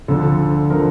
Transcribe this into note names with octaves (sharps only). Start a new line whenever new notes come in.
D2 D3 F3 A4
D3 F3 A#4